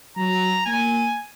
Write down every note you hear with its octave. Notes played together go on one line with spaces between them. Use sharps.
F#3 A#5
A#3 G#5